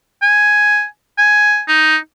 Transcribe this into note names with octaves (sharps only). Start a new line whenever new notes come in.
G#5
G#5
D#4